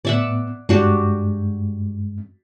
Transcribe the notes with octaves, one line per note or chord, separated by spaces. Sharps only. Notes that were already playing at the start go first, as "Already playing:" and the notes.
A2 B3 D5 E5 F#5
G2 G#3 D4 F#4 G4